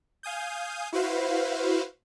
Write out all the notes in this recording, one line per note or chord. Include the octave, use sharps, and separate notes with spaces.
F5 G#5 D#6 G6
E4 F#4 B4 C5 F5